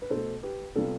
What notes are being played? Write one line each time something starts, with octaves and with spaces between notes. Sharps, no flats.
B4
B2 A3 A4 C5
G4 B4
C3 G3 B3 F4 A4